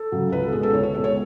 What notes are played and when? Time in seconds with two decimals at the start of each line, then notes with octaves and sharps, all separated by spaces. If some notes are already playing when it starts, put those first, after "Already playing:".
Already playing: A4
0.12 C#3 F#3
0.32 C#2 B4
0.43 A4
0.53 B2 G#3 G#4
0.63 A4
0.73 C#2 C#5
0.83 C#5
0.94 B2 G#3 A4
1.04 C#5